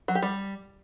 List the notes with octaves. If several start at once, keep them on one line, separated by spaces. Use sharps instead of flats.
F#3
G4
G3